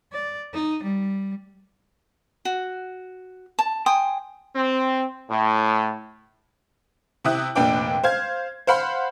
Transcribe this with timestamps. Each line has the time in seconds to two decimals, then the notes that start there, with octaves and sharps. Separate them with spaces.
0.12 D5
0.53 D#4
0.83 G3
2.45 F#4
3.59 A5
3.86 G5 G#5 C6 D#6
4.55 C4
5.30 A2
7.24 C3 C4 E4 D#6 F#6
7.55 F1 A#2 D4 B4 G5 D6
8.04 C5 F5 G#6
8.67 C5 F5 F#5 B5 C6